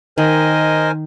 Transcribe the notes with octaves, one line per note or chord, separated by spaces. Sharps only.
D#3 A#4 C5 D#5 G#5